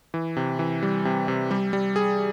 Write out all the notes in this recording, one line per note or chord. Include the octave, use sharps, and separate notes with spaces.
E3
C3
E3
G3
C3
C3
G3
G3
G#4